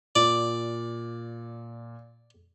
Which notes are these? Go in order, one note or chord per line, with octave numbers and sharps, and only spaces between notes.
A#2 D5